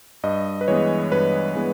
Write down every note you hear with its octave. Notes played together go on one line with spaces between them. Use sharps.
G2 D#5
B4
E3 G#3 B3 C#5
G2 B4
E3 G#3 B3